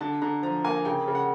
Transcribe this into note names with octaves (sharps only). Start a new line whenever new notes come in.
D3 A5
D3 A#5
F3 A#5
A#3 G#5
C#3 G5
C#3
F#5